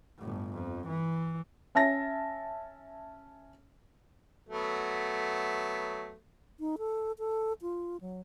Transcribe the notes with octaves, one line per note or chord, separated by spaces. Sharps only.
G1 A2
F2
E3
C#4 E5 A5 A#6
F#3 A3 B3
D#4
A4
A4
F4
F#3